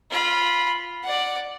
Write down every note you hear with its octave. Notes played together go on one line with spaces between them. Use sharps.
F4 B5
D5 F#5